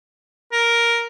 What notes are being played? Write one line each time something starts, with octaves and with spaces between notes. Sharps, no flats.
A#4